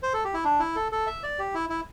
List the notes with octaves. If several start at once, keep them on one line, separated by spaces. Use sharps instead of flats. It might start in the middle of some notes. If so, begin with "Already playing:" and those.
C5
A4
G4
E4
D4
E4
A4
A4
E5
D5
G4
E4
E4